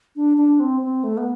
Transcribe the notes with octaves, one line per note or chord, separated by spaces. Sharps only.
D4
D4
C4
C4
A3
B3